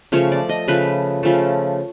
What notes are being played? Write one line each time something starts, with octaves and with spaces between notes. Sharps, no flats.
C#3 F3 A3 C#5
D5
D#5
C#3 F3 A3 B4
C#3 F3 A3